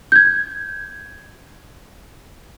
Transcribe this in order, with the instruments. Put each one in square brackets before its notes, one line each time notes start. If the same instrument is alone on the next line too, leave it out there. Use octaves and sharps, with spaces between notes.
[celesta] G6 G#6